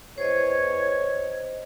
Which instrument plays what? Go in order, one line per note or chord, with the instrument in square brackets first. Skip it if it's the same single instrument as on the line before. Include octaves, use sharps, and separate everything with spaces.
[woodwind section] E2 C#5 [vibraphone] C5 D#5